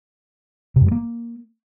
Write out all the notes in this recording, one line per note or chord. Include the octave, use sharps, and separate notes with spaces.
C3
F#2
G3
A#3